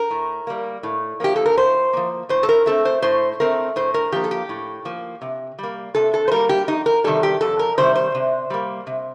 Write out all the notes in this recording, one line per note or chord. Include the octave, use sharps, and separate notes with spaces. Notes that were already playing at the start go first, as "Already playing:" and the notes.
Already playing: A#4
A2
G3 A#3
A2
F3 A#3 G4
A4
A#4
A2 C5
F3 A#3
A2 C5
A4
A#4
A3 C4 A4
C5
A2 C5
A3 C4 A#4
A2 C5
A#4
F3 A#3 G4
A4
G4
A2
F3 A#3
C3
G3 A#3
C3 A4
A4
C5
G3 A#3 A#4
G4
F2 D#4
A#4
C3 D#3 G3 A4
G4
F2 A4
A#4
C3 D#3 G3 C5
C5
C3
G3 A#3
C3